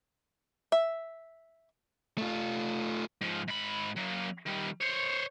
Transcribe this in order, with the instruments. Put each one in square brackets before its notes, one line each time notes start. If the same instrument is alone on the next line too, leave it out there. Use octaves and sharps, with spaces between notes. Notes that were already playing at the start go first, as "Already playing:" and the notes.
[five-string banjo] E5
[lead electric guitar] A3 F4
[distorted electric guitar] G#2 F3
G#2 B5
F#3 A#3
D#3 G3
C5 C#5